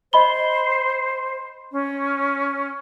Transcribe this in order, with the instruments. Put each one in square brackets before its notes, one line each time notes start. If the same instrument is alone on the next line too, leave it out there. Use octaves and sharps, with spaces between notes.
[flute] C5 [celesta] D#5 B5 G7
[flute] C#4